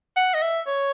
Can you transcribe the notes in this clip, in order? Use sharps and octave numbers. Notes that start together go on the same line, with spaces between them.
F#5
D#5
E5
C#5